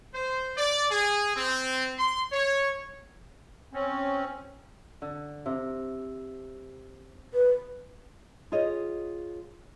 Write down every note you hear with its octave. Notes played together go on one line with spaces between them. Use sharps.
C5
D5
G#4
C4
C6
C#5
C4 C#4
D3
C3
B4
F4 G#4 C#5 D#5